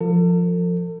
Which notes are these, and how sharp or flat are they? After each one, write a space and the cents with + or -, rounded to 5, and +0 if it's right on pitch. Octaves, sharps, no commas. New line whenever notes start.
F3 +0 A4 +40